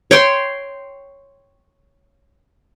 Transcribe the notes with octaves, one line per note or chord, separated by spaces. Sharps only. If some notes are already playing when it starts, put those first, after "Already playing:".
C#5 G5 C6